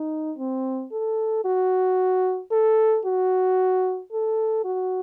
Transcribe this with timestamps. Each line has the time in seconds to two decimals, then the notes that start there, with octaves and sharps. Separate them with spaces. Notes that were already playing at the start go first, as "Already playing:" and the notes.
Already playing: D#4
0.38 C4
0.92 A4
1.45 F#4
2.52 A4
3.05 F#4
4.12 A4
4.65 F#4